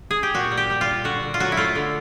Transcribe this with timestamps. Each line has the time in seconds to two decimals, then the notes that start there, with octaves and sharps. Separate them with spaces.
0.11 G#4
0.23 G4
0.34 A#2 F#4
0.51 G3
0.57 G4
0.70 G3
0.81 F4
0.87 A#2
1.04 D3 F#4
1.23 D3
1.34 F4
1.40 F#3 F#4
1.52 E4
1.57 A3 F4
1.76 D3